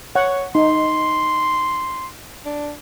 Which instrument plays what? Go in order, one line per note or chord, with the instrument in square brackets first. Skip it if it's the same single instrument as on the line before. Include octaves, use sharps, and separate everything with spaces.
[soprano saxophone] C#5 [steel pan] F#5
[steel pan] D#4 [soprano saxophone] C6
[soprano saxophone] D4